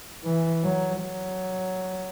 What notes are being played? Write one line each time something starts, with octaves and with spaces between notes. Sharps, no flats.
E3
F#3
F#3